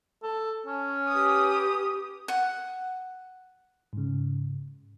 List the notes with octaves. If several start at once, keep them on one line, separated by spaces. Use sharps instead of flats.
A4
C#4
G4 B4 D#6
F#5
G#2 C#3